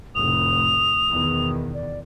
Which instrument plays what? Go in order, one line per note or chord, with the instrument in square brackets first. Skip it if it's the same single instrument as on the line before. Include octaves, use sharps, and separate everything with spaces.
[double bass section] F1 A2 [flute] D#6 [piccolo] F7
[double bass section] E2 B2 D#3
[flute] D5